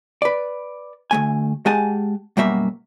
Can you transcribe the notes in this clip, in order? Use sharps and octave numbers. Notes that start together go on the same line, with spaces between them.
B4 D5
D2 A3 G#5
G#3 G4 F#5 G#5 A5
F#2 B2 G3 A#3 F#4 E5